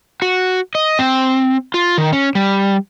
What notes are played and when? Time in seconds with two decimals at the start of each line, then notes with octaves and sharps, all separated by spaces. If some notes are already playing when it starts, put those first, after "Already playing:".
0.22 F#4
0.75 D#5
0.99 C4
1.74 F4
1.97 D#3
2.13 C#4
2.35 G3